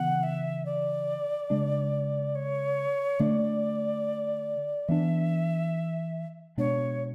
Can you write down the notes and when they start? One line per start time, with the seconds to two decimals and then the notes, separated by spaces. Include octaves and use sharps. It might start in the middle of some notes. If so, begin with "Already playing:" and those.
Already playing: C#3 E3 B3 F#5
0.23 E5
0.65 D5
1.50 C#3 G#3 D4
2.35 C#5
3.19 D3 A3 D4 D5
4.88 E3 B3 D4 E5
6.57 B2 G#3 B3 D4 C#5